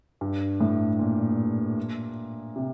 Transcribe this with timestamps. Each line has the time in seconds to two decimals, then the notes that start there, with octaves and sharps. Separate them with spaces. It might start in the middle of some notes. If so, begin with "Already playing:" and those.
0.21 G2
0.61 A2
0.99 A#2
2.56 C3